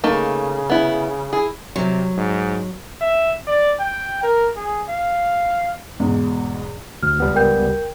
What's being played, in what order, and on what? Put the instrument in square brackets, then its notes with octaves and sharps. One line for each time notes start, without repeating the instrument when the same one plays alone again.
[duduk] C#3 [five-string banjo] A3 A#3 D#4
[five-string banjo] B3 E4
[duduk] E4 [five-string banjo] G#4
[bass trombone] C3 [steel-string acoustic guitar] F#3
[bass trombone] G#2
[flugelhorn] E5
D5
G5
A#4
G#4
F5
[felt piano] E2 G#2 B2
[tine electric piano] D2 [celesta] F6
[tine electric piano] C#2 G3 B3
[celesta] A#4 G5 G6